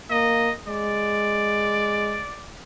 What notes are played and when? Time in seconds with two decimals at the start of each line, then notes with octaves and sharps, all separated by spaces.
0.11 A#3 D#5
0.67 G#3 D5